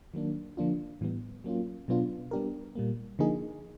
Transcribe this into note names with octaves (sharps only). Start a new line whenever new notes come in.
D#3 F#3 A#3 D4
D3 F3 A#3 D4 F4
A2 E3 G3 B3
F#3 A#3 C#4 F4
B2 F#3 B3 D4 F4
G3 B3 D4 G4 A#4
A#2 G3 A#3
D3 F3 A#3 D#4 G#4